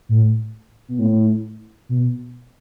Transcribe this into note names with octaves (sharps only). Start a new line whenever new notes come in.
A2
B2
A2
B2